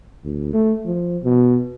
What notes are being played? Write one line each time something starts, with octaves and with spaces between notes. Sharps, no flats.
D2
A3
F3
B2